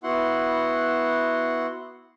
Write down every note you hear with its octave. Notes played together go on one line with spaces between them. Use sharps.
B3 E4 F#4 F#5 C6